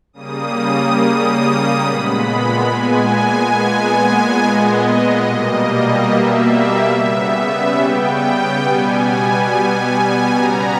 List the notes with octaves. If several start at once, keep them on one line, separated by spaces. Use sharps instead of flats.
C#3 G3 A#3 D#6
D#6
A#2 G#3 B3 B5
G#5
A#2 G#3 B3
D#5
B2 G3 A#3
E5
C#3 G3 B3 E5
G5
B2 G3 B3 G#5
C#3 G3 B3 A#5